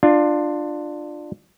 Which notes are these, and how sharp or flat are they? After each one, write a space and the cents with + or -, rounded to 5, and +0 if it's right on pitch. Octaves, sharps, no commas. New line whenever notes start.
D4 +20 F4 +0